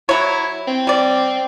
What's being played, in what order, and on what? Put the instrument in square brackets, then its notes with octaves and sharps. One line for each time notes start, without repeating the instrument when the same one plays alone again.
[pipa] F#3 C#5 [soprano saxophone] E4
[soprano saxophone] C4
[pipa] G3 D5